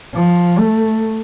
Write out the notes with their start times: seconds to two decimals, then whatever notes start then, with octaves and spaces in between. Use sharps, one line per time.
0.14 F3
0.58 A3